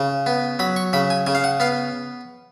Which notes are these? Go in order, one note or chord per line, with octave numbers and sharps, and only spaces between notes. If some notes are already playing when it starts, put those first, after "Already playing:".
Already playing: C#3
B3
F#3 B5
C#6
C#3 B5
G#5
C#3 G#5
F5
F#5
B3 F5